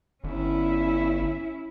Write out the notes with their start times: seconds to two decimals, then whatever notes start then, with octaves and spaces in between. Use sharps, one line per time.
0.24 G1 C#4 E4